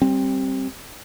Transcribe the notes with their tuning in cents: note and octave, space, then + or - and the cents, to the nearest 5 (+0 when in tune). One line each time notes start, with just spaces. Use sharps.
G3 +0 C4 +20